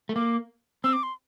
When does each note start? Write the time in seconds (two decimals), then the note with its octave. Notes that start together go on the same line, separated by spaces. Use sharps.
0.09 A3
0.16 A#3 D6
0.84 C4 E6
0.93 D6
1.03 C6